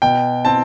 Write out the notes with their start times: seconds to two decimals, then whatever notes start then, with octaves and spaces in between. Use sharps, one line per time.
0.02 B2 G5
0.45 C4 A5